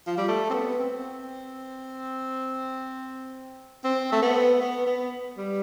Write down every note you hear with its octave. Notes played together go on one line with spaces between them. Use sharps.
F3
G3
A3
C4
B3
C4
C4
A3
B3
B3
B3
G3